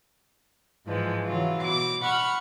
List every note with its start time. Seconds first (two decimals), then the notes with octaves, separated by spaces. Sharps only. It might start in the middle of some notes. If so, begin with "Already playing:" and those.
0.86 G#2 E3 F3 G#3
1.24 C#3 E3 F#3 F4
1.61 B2 D6
2.01 F#5 B5 C#6 F6